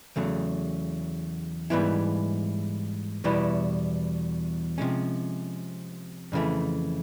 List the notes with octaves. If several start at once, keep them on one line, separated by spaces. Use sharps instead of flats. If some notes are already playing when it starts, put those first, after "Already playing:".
E2 C#3 F#3 A3
G#2 E3 G3 B3 E4
E2 B2 G3 B3 E4
C3 F3 G#3 C#4
F2 C#3 E3 A3